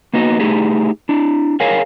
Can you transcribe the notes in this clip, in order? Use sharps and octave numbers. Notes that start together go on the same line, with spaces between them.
A#3 B3 D#4 F#4
A3 D#4 E4 G4 G#4
D4 E4
G#4 A#4 C#5 F5 G#5